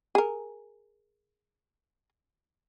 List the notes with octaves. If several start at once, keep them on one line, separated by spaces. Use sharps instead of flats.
G#4 A#4